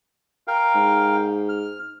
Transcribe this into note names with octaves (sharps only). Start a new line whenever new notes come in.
A#4 F5 G5
G#2
F6